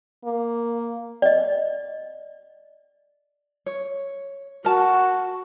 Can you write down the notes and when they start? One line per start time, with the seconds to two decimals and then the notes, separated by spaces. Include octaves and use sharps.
0.24 A#3
1.22 D5 D#5
3.66 C#5
4.65 F#4 A#4 A5